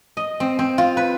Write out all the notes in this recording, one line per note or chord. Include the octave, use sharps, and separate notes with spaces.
D#5
C4
C4
F4
B4